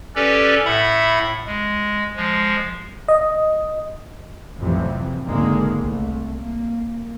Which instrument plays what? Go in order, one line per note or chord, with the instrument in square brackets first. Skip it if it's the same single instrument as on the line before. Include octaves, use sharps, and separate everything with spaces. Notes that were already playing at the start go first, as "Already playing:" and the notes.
[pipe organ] C#4 G4 A4 B4 D5
A2 E5 F#5 B5
G#3
F3 G#3
[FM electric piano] D#5
[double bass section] A1 F2 C3 E3 F#3
G#1 C#2 D3 D#3 G#3 A#3
C2 A3
A#3